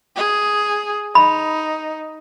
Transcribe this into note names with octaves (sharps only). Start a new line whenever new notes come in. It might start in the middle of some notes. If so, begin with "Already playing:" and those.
G#4
D#4 B5